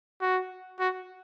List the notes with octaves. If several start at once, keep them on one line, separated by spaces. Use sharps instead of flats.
F#4
F#4